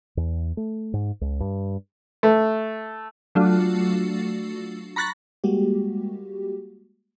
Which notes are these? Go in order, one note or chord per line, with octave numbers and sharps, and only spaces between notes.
E2
A3
G#2
C#2
G2
A3
F#3 A3 D4 F4 F#4
A#5 B5 C#6 F#6 A6 A#6
G3 G#3 A#3 F#4 G4